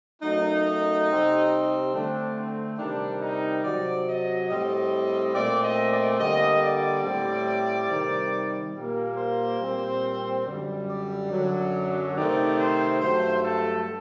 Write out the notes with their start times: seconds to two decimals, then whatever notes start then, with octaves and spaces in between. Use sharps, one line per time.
0.22 F#2 F#3 A3 D#4
1.07 C3 G3 C4
1.93 D3 A3 C4 D4
2.35 C4
2.77 C3 D#3 G3 D4
3.20 D#4
3.63 C3 F#3 C4 D5
4.06 D#5
4.48 A2 G3 C4 D#5
5.33 A#2 A3 C4 D5
5.62 D#5
5.90 D5
6.19 D3 G3 A#3 D#5
6.61 D5
7.04 A2 G3 C4
7.90 C3 D#3 G3
8.75 A#2 G3 A#3
9.17 C5
9.59 A#2 G3 C4
10.45 F#2 D3 G3
10.88 D5
11.31 F#2 D3 F#3
12.15 C3 D#3 A3 C4 D5
12.58 C5
13.00 G2 F#3 A3 C5
13.43 A4